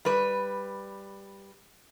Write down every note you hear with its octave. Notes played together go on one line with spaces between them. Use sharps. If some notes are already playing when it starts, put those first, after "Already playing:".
G3 B4